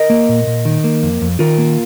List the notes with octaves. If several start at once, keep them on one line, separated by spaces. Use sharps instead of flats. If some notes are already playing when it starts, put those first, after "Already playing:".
Already playing: A#4 D#5
A#3
A#2
A#2
D#3
A#3
F2
F2
D#3 F4 A#4
A#3